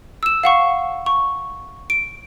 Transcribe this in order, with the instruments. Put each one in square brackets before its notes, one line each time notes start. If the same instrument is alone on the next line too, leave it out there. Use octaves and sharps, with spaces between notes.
[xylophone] E6 E7
F5 F#5 C#6
C#6
D7